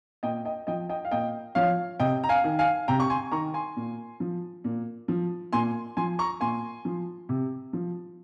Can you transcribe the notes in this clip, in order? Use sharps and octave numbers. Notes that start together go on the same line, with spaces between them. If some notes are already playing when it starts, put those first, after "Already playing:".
A#2 D#5 G5
D#5 G5
F3 D#5 G5
D#5 G5
F5
A#2 D#5 G5
F3 C#5 F5
C3 D#5 G5
A#5
F5 G#5
D#3
F5 G#5
C3 G5 A#5
C#6
G#5 C6
D#3 A#5 C#6
G#5 C6
A#2
F3
A#2
F3
A#2 G#5 C6
F3 G#5 C6
A#5 C#6
A#2 G#5 C6
F3
C3
F3